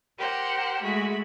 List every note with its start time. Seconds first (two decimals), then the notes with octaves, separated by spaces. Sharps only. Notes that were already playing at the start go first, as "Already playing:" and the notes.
0.19 G4 A#4 C5 F#5
0.83 G#3 A3 F#4 B5